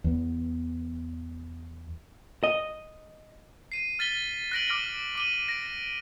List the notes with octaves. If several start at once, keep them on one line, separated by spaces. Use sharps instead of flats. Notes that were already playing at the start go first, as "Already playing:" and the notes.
E2 B3
D#5
C7 D#7
F6 A6 B6 G7
F#6 A6 A#6 D7 D#7 F#7
D6 F6 A#6 D7 G7
D6 D#7 G7
A#6 D7